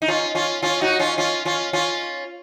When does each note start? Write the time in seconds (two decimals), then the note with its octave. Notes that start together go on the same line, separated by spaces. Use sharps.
0.02 D#4
0.08 C#4 F4
0.35 C#4 F4
0.62 C#4 F4
0.81 D#4 F#4
0.99 C#4 F4
1.18 C#4 F4
1.45 C#4 F4
1.73 C#4 F4